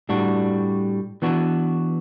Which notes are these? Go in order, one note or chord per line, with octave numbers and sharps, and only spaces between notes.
A2 G3 D4 F#4
E3 B3 D4 F#4